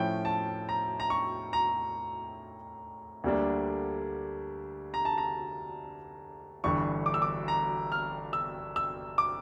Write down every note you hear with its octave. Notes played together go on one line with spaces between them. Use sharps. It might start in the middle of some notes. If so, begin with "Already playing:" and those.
Already playing: A2 F3 C#4 E4 G5
A5
A#5
A#5
C#6
A#5
D2 D3 G3 A#3 D4
A#5
A5
A#5
G1 G2 E3 C#6
D6
E6
D6
A#5
F6
E6
E6
D6